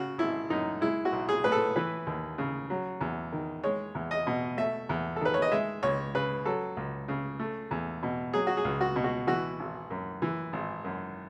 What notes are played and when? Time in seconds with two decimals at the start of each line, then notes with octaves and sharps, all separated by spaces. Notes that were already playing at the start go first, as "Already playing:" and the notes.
Already playing: C#3 F#4
0.18 G#1 E4
0.50 F#2 D#4
0.81 G#3 E4
1.05 F#4
1.12 B1
1.29 G#4
1.44 A2 B4
1.52 A4
1.76 E3 B4
2.07 D#2
2.38 C#3
2.70 F#3
3.01 E2
3.32 D#3
3.64 G#3 C#5
3.95 E2
4.11 D#5
4.27 B2
4.57 A3 E5
4.89 E2
5.16 A4
5.20 D#3 B4
5.34 C#5
5.42 D#5
5.51 G#3 E5
5.83 C#2 C#5
6.15 C#3 B4
6.45 F#3 A4
6.77 C#2
7.08 C#3
7.39 A3
7.71 E2
8.03 B2
8.33 F#3 G#4
8.47 F#4
8.57 G#4
8.65 C#2
8.81 F#4
8.96 B2
9.04 F#4
9.27 E3 F#4
9.59 G#1
9.90 F#2
10.22 E3
10.53 G#1
10.84 F#2